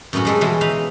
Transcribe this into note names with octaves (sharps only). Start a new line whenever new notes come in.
F#2 A2 B3 C#4 F#4
G3 G#3 A4
B2 E3 G#3 F#4 A5
E3 D#4 B4 F5